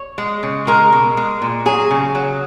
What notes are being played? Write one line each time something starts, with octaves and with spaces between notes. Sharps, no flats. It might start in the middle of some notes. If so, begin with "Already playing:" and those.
Already playing: C#5
G#3
C#3
G#3 A#4
B2
G#3
A#2
F#3 G#4
C#3
F#3